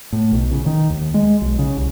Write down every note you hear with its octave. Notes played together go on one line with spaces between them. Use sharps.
A2
B1
C#3
D#3
D#2
G#3
B1
C#3
C2